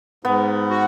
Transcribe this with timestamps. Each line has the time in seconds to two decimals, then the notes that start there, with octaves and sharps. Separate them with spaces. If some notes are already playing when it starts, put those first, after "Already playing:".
0.24 G#2 B3
0.70 F#4